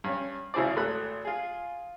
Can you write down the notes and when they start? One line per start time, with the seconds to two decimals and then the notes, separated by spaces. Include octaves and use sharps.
0.04 G2 C#4
0.54 G#1 C#3 E4 G#4 C5 D5
0.76 G#1 A3 B5 F#6
1.25 F4 G#4